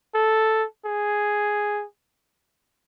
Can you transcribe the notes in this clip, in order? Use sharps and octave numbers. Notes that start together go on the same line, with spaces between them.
A4
G#4